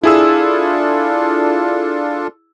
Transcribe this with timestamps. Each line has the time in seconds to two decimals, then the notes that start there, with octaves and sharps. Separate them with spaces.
0.03 D4 E4 F4 G#4 A4 E6